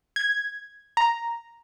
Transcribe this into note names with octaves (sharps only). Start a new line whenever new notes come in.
G#6
A#5